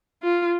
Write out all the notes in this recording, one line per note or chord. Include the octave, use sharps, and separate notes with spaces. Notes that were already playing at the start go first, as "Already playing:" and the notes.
F4